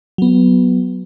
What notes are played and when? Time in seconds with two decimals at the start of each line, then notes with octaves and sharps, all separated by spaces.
0.18 F#3 B3